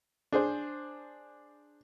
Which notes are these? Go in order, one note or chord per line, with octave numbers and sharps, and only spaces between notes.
D4 G#4 C5